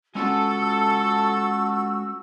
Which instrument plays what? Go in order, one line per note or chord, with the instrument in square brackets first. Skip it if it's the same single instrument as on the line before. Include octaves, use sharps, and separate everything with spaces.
[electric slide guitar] G#3 C#4 F4 [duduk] F#4 [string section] A4 [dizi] E6